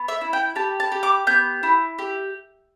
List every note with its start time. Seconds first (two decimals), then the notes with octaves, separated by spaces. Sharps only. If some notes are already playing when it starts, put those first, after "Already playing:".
Already playing: B3
0.08 E5
0.21 E4
0.33 G5
0.56 G4 A5
0.80 A5
0.92 G4
1.03 D6
1.27 B3 G6
1.63 E4
1.99 G4